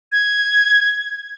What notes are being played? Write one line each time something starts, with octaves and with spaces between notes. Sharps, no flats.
G#6